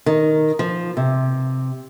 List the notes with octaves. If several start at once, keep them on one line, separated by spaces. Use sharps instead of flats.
D#3
F3
C3